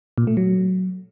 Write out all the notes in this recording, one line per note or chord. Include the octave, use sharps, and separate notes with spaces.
A#2
A3
F#3